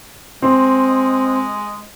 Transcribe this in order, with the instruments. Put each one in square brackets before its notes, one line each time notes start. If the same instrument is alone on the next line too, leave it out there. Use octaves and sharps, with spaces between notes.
[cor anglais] G#3 [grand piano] C4